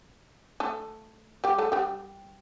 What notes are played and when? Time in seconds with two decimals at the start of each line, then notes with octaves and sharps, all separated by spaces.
0.60 A3 A4
1.44 G3 G4
1.59 A3 A4
1.72 G3 G4